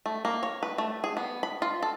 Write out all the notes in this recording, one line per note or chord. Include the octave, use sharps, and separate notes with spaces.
A3
A#3
C#5
B4
A3
G#4
B3
B5
F4
A4